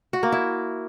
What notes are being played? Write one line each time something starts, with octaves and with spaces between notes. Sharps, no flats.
F#4
A#3
E4